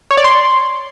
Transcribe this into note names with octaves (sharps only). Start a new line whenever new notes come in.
C#5
D5
C6